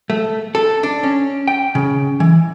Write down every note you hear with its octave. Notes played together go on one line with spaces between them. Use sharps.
A3
A4
D4
C#4
G5
C#3
E3